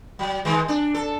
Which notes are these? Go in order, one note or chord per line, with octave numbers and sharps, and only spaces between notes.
F#3
D#3 G#3
D4
A4